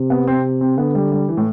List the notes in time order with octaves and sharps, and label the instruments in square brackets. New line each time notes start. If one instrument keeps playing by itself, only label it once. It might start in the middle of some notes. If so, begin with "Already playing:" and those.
Already playing: [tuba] C3
[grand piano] B3
C4
C4
[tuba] D3 [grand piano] B3
[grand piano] G3
G3
E3
A2